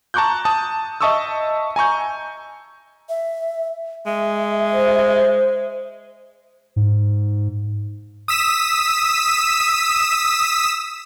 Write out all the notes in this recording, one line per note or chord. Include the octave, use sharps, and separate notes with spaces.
A5 A#5 C#6 D6 F#6 G6
A5 D#6
D#5 E5 A5 C#6 D#6 E6
G#5 A#5 C#6 G6
E5
G#3 E5
C5
G#2
D#6 E6 B6 E7